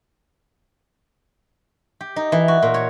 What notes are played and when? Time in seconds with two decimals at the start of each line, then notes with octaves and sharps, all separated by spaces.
2.01 G4
2.16 D#4
2.32 E3
2.48 F#4
2.62 A#2
2.74 C#5